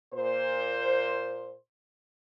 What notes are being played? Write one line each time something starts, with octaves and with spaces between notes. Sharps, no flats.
A#2 C5